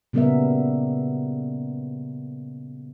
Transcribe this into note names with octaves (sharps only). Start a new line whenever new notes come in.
A#2 C#3 G3 B3 A#4 E5